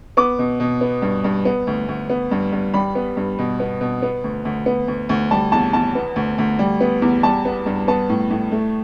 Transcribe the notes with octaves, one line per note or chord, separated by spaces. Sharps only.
B3 D6
B2
B2
B3
G2
G2
B3
D2
D2
B3
G2
G2
G3 B5
B3
G2
B2
B3
B2
B3
D2
D2
B3
D2
D2
G3 A5
E2 A5
E2 A5
B3
D2
D2
G3
B3
E2
G3 A5
B3
G2
B3 A5
A2
A2
A3